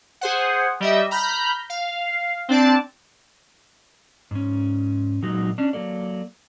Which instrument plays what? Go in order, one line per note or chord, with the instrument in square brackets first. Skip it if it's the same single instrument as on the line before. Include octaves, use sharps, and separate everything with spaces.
[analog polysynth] G#4 C5 F#5
G3 D#5 E5
A#5 B5 F6 G6 B6
F5
C4 D4 D5 A5
[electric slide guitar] G#2 C#4
A#2 F#3 G#3 D#4 F#4
C#4 D4
F#3 A#3 A4 D5